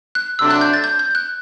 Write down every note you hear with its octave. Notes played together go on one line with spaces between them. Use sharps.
F#6
C3 F#3 A3 D4 E6
F#6
G6
A6
G6
G6
F#6